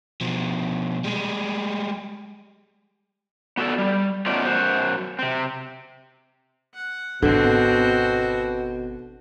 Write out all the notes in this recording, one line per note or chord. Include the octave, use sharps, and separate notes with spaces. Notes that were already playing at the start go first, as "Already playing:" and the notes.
B2 F3
G3 G#3
B3 F#4 G#4 A4 D5
G3
A3 B3 C#4 D#4 F4 D5
F#2 F#4 C5
C3 C4
F#5
G#1 B2 D3 B3 C4 F#4